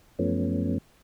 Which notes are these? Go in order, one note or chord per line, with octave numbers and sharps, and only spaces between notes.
F#2 F3 A3 B3 C#4